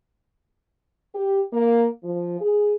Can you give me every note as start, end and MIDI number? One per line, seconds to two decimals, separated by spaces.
1.15 1.40 67
1.53 1.88 58
2.04 2.39 53
2.41 2.74 68